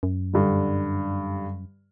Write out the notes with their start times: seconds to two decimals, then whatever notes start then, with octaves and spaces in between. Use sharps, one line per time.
0.03 F#2
0.33 G2 D3